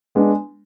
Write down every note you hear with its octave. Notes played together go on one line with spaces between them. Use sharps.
G#3 B3 D4